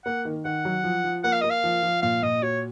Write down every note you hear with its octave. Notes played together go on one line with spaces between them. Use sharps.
A#3 F#5
D#3
D#3 F#5
F#3
F3
F3
A#3 F#5
F5
A#3 D#5
F5
F3
F3
A#2 F5
A#2 D#5
F#4 C#5